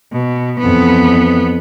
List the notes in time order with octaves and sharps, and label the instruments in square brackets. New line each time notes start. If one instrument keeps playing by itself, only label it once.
[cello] B2
[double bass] F2 E3 [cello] B3